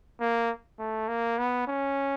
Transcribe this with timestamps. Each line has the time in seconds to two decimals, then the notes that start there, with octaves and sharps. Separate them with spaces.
0.20 A#3
0.79 A3
1.08 A#3
1.38 B3
1.67 C#4